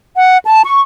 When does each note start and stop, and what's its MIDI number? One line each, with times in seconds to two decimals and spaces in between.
0.15 0.37 78
0.45 0.61 81
0.64 0.81 85